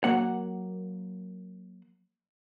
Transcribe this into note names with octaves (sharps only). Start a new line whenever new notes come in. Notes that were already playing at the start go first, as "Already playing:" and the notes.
F#3 A#3 F#5